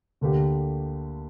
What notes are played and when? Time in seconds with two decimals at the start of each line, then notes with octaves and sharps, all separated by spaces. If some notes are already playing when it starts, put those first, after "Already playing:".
0.21 D2 D3 A#3 G4